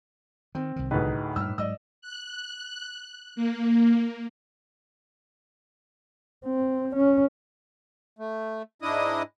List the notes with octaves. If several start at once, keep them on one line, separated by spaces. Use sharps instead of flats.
D#3 C4
C2 D#3
D2 A2 D#4 G#4 B4
G2 A#2 E6 F6
G#2 F#3 D5 D#5 E6
F#6
A#3
C4
C#4
A3
G#2 D4 E4 D#5 D#6